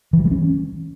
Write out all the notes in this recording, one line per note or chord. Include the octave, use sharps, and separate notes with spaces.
E3
G3
G#3
C#4